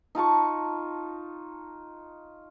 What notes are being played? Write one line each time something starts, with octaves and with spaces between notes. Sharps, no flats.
D#4 F4 A5 C#6